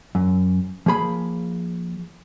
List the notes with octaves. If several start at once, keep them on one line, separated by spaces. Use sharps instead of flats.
F#2
F3 A#3 G#4 B5